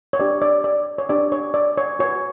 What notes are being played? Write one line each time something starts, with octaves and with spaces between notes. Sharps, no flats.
C#5
D4 G4 B4 D5
D5
D5
C#5
D4 G4 B4 D5
C#5
D5
C#5
F#4 B4 C#5